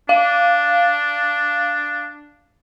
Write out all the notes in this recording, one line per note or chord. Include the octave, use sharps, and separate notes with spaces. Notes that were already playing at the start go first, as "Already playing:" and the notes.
D4 F5